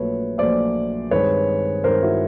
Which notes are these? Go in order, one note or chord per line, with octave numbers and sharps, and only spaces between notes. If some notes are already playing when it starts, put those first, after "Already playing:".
Already playing: A#1 A#2 F#3 A3 B4 C#5
A#1 A#2 F#3 A3 C5 D5
G2 D#3 G#3 C4 B4 C#5
G2 D#3 G#3 C4 A#4 C5
E4 F#4